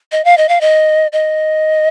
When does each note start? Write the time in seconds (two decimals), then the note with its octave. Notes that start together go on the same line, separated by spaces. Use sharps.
0.12 D#5
0.25 F5
0.37 D#5
0.49 F5
0.61 D#5
1.13 D#5